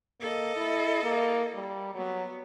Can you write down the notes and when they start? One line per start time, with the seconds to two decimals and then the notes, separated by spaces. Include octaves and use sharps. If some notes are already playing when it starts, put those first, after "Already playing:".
0.20 A#3 A4 D#5
0.56 E4
1.03 A#3
1.55 G3
1.95 F#3 B3